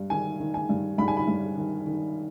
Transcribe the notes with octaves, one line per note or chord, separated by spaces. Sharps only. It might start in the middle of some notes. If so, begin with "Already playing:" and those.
Already playing: G2
D#3 G#5
D#3
G#5
G2
G2 B5
G#5
B5
G2
D#3
D#3